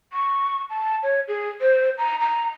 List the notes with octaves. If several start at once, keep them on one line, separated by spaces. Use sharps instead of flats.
C#6
A5
C#5
G#4
C5
A#5
A#5